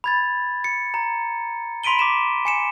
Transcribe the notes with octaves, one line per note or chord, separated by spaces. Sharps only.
B5 G#6 A6
C#7
A#5
B5 C6 B6 D7 D#7 G7
D6 B6 E7
G#5 C#7 E7